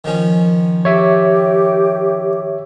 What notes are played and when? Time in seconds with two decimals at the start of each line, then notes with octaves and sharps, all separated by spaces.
0.04 D#3 F3 C#4
0.85 G4 C#5 E5